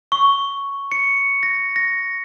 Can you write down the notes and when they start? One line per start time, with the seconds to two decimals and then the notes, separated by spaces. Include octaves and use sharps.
0.12 C#6
0.92 C#7
1.43 A#6
1.76 A#6